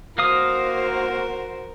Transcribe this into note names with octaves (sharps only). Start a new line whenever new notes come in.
A#3 F#4 A#4 C5 F5 D#6